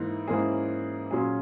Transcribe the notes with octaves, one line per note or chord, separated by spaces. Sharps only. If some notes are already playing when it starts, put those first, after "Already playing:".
Already playing: G#2 E3 A#3 D#4
G#2 E3 A#3 C#4 G#4
A#2 F#3 C#4 G#4